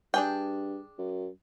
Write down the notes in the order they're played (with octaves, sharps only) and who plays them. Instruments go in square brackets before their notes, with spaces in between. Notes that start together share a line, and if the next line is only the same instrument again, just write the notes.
[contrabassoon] G2 [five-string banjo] D4 G#4 G5
[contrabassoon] F#2